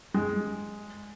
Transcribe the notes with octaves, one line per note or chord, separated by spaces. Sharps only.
G#3